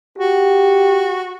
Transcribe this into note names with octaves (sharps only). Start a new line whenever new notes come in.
F#4 G4